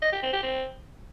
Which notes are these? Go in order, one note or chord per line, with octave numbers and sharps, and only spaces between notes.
D#5
G4
C4
G4
C4